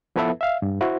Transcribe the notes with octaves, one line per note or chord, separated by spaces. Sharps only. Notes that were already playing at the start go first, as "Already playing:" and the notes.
F3 B3 E4 A4 B4 E5
E5 F5
G2
E4 F#4 C5